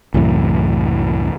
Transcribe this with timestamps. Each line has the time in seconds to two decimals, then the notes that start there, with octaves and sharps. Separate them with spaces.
0.14 C2 F#2 A2 E3